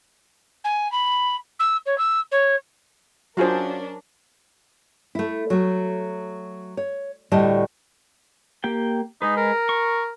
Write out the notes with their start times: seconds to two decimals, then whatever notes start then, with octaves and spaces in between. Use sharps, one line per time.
0.64 G#5
0.91 B5
1.59 E6
1.85 C#5
1.98 E6
2.31 C#5
3.37 F#3 C#4 D4 F4 F#4 G#4 A#4 C5
5.15 A3 E4
5.50 F#3 A3
6.77 C#5
7.31 D2 A2 G3 A3 D#5 A5
8.64 A#3 G4 G5
9.22 G#3 D#4 B4
9.37 A#4
9.69 C#6